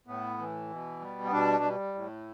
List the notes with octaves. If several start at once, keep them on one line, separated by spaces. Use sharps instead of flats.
A2 B3
E3
B2
G3
B3
B2 D4
G3
A2